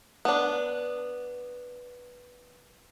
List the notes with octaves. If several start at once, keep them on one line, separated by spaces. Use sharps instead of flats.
B3 D4